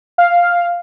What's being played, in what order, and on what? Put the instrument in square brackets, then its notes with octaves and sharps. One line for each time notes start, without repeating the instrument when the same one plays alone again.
[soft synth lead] F5